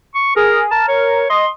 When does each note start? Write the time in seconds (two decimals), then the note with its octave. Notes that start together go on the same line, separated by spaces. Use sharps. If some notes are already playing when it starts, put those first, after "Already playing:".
0.15 C#6
0.36 G#4 A#4
0.71 A#4 A5
0.89 C#5
1.30 D#5 C6